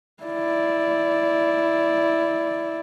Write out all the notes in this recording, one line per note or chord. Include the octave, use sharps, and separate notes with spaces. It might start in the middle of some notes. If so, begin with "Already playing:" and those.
E4 D5